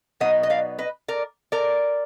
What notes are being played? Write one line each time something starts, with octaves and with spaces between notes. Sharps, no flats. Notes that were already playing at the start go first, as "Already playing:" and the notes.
B2 F#3 B3 D#4 D#5 F#5
D#5
D5 F5
B4 D#5
A#4 D5
A#4 D5